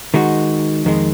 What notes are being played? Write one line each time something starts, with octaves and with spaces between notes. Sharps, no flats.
D#3 G#3 D#4 F#4
F2 D#3 G#3